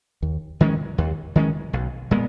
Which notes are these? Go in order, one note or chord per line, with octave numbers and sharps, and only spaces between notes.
D#2
D#3 G#3 C#4
D#2
D#3 G#3 C#4
B1
A#2 G#3 B3